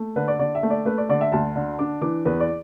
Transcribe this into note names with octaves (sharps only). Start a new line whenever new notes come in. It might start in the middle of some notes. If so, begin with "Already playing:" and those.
Already playing: A3
D3 B4
D5
D3 D5
E5
A3
D5
A3 B4
D5
D3 D5
E5
D2 A5
D3
D4 D6
E3 D6
E2 B4
D5